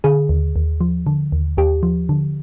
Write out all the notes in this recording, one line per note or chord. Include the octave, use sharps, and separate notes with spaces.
D3 G#4
D#2
D#2
F3
D3
D#2
D#2 G4
F3
D3